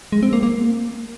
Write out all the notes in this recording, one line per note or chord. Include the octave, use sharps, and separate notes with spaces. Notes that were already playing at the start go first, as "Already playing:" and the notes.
G#3
C4
A#3
A#3